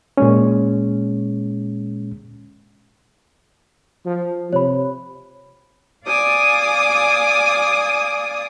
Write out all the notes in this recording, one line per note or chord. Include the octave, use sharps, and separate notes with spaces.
A#2 G#3 C#4
F3
C3 C#5 B5
D5 F5 G#5 D6 D#6